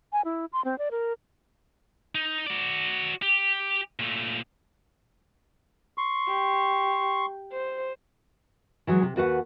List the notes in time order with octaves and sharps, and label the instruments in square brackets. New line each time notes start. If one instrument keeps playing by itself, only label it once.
[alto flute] G#5
E4
C6
C4
D5
A#4
[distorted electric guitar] D#4
F#4 D5
G4
A#2 A3
[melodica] C6 C#6
[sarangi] G4
C5
[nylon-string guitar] E3 F#3 G#3
C3
D#2 F#4 B4 F#5